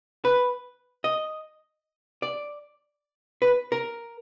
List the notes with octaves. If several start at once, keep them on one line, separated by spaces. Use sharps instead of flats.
B4
D#5
D5
B4
A#4